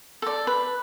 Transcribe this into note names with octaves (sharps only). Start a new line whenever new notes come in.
A4 D5
B4